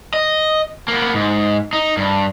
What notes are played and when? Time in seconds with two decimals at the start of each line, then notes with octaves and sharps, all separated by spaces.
0.14 D#5
0.88 A#3 B3
1.14 G#2
1.73 D#4
1.97 G2